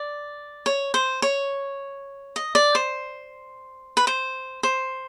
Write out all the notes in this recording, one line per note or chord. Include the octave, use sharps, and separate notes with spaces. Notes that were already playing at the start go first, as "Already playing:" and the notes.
Already playing: D5
C#5
C5
C#5
D#5
D5
C5
B4
C5
C5